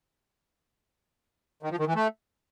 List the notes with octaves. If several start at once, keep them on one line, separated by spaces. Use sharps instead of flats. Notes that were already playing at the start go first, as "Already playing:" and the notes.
D#3
F3
D#3
E3
A3